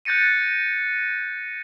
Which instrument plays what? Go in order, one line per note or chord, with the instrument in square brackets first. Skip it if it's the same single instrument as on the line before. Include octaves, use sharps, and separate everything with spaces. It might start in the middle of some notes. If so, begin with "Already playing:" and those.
[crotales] F#6 G6 A6 A#6 C#7 D#7